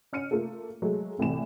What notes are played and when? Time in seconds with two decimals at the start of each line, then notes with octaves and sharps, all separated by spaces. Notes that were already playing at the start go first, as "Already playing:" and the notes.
0.13 C#4 F6 C#7 D#7
0.31 A3 A#3 F4 A4
0.82 F#3 G#3 A3
1.19 C2 A2 C3 E3 E7